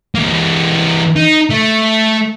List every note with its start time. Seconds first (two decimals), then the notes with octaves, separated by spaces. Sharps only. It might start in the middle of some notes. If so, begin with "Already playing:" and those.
0.15 E3 A#3
1.16 D#4
1.50 A3